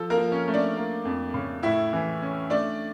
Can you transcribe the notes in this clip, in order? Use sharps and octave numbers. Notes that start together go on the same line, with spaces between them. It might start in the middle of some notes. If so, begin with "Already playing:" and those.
Already playing: F3 A4
A#3 A#4
F3
C#4 C#5
A3
D4 D5
A#3
F2
C#3
A2 E4 E5
E3
C#4
A3 D4 D5